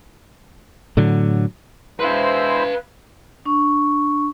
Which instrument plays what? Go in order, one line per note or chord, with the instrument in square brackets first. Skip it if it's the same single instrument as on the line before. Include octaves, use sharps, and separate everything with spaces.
[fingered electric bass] A2 D3 F#3
[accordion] G#3 E4 C5 [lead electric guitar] B4 F5
[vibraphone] D4 C#6